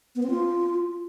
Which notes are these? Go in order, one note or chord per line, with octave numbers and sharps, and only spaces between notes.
B3
C4
F4